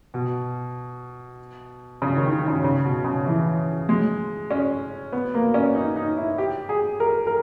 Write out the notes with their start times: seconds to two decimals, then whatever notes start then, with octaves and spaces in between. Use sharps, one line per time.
0.14 B2
2.02 C#3
2.17 D#3
2.32 D#3
2.48 C#3
2.64 C#3
2.85 B2
3.05 C#3
3.26 E3
3.89 G#3
4.51 C#4
5.13 B3
5.34 A#3
5.54 C#4
5.75 D#4
5.96 D#4
6.17 E4
6.38 G4
6.69 G#4
7.00 A#4
7.27 A#4